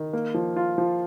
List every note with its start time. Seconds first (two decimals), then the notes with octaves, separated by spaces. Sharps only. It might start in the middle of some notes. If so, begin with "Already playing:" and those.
Already playing: D#3
0.13 A#3
0.34 F3
0.56 F4
0.78 F3